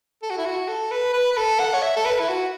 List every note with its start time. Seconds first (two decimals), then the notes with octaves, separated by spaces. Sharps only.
0.22 A4
0.30 F#4
0.38 E4
0.46 F#4
0.68 A4
0.91 B4
1.13 B4
1.32 B4
1.37 A4
1.59 F#5
1.74 C#5
1.82 E5
1.96 A4
2.05 B4
2.20 E4
2.28 F#4